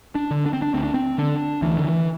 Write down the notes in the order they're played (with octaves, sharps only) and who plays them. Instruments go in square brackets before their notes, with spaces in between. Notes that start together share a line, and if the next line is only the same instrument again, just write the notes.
[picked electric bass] D4
D3
D4
C4
D4
D2 C4
D4
C4
D3 D4
D2 E3
D3
E3